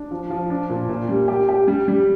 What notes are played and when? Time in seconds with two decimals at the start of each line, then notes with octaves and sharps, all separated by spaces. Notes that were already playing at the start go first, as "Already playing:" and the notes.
Already playing: D4
0.11 F3
0.30 F3
0.50 D4
0.70 A#2
0.89 A#2
1.09 G3
1.28 G4
1.49 G4
1.68 G3
1.88 G3